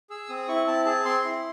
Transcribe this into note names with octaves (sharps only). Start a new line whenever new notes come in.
G#4 E6
C4 D#6
E4 C#6
C4 A5
G#4 A5
C4 C6
E4